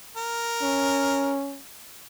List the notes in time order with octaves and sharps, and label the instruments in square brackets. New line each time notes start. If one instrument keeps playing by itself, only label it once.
[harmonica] A#4
[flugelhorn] C#4